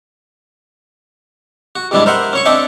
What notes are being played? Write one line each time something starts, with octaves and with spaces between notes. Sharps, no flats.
F#4
E2 G2 E3 G#3 D4 E4
A#4 C5 E5 F#5 C6
C#4 C#5 C#6
C4 D4 A4 D#5 E5 G5